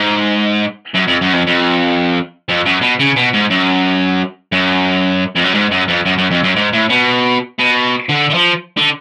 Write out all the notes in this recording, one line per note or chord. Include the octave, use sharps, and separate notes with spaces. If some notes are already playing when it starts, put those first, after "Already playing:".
Already playing: G#2
F#2
F2
F#2
F2
F2
F2
F#2
B2
C#3
B2
G#2
F#2
F#2
F2
F#2
G#2
F#2
F2
F#2
F#2
F2
F#2
G#2
A2
B2
B2
D3
D3
F3
D3